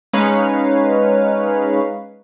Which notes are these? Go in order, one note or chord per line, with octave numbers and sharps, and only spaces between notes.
G#3 C#4 D#4 B4 C#5 F5